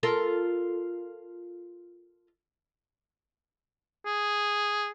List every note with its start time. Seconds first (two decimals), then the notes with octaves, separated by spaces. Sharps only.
0.03 F4 A4 A#4
4.06 G#4